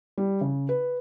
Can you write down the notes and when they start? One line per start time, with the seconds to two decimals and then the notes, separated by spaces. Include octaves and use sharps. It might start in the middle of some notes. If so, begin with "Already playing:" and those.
0.18 G3
0.41 C#3
0.69 B4